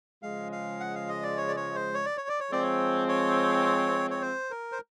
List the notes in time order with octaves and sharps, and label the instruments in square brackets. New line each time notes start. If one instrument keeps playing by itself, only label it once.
[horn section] C#3 F3 G#3 [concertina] F5
[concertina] F5
F#5
F5
D#5
D5
C#5
D5
C#5
C5
C#5
D5
C#5
D5
C#5
[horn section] F3 G#3 C4 [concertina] D5
[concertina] C#5
C#5
C#5
C5
A#4
C5